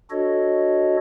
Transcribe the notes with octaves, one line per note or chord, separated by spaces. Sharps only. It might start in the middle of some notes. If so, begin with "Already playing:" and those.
D4 F#4 A4 C#5 D#5